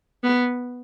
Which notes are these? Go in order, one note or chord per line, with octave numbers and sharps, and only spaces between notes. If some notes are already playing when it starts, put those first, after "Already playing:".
B3